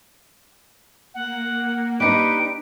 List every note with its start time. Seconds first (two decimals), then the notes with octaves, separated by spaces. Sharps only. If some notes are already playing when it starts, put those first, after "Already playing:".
1.14 A#3 F#5
2.00 D4 D#4 G4 B4 D7